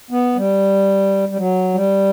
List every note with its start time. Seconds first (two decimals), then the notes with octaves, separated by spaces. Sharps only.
0.11 B3
0.36 G3
1.29 G3
1.37 F#3
1.74 G3